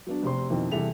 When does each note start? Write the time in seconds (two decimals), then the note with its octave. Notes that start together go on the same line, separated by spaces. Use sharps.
0.07 F#3 B3 D4
0.23 F1 C3 C4 C6
0.50 F2 B2 D#3 C4 E4
0.71 E2 C3 G3 A4 E5 F7